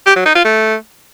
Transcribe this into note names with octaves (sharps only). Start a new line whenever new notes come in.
G4
F#3
D#4
F4
A3